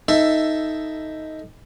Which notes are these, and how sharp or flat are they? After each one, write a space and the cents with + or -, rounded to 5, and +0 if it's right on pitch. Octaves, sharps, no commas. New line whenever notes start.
D#4 +10 A4 +0 E5 +10